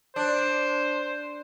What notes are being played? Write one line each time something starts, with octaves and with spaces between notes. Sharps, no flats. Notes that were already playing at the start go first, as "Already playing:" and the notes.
D4 C5